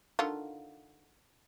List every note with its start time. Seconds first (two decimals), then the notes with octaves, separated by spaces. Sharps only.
0.19 D3 D#3 F4